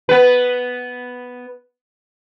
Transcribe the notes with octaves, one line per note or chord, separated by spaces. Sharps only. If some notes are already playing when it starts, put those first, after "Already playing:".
B3 B4